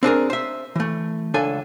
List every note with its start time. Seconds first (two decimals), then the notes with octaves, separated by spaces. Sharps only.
0.03 C4 D4 G#4 A#4
0.30 C5 E5
0.76 E3 A3
1.34 C#2 D4 A4 G#5